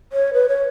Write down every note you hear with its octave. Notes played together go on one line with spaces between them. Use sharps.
C#5
B4
C#5